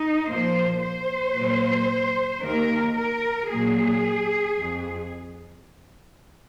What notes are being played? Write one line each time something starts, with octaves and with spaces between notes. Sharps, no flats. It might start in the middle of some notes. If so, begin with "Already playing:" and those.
Already playing: D#4
A#2 F3 A#3 C5
C5
A#2 F#3 A#3
D#2 D#3 A#3 A#4
A#4
A#2 F#3 A#3 G#4
F2